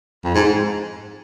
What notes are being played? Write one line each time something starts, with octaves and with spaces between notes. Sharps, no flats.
F2
G#2
G#2